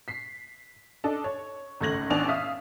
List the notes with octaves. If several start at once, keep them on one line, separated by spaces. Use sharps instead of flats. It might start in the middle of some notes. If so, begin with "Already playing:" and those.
B6 C7
D4 A4 D#5
C#5
G#1 C#2 A3 G#6 A#6 F#7
A1 B3 D4 G#5 F7
E5 F5 D#6